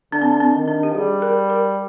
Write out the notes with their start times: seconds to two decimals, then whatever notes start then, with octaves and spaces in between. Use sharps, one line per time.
0.12 D3 D4
0.22 C4
0.31 D4
0.40 C4
0.54 D#3
0.68 D4
0.83 G4
0.95 G3 G#4
1.22 A#4
1.50 A#4